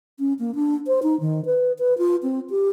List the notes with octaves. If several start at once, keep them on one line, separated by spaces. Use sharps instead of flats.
C#4
A#3
D4
C5
D#4
D#3
B4
B4
F4
C4
G4